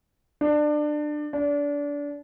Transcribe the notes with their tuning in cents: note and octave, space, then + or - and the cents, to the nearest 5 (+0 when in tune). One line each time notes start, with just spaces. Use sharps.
D4 +25
D4 -25